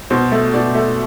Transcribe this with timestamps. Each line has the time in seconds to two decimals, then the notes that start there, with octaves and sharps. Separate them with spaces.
0.10 B2 C5
0.32 A3
0.53 B2 D5
0.75 A3